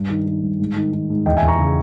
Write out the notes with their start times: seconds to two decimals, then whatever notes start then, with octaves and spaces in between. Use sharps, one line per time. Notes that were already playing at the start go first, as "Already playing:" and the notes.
Already playing: G2
0.10 D#3
0.26 D#3
0.42 G2
0.59 G#2
0.76 D#3
0.93 D#3
1.10 G#2
1.26 E2 D#5 G5
1.37 E5 G#5
1.42 E2
1.48 A#5 C#6
1.58 C#3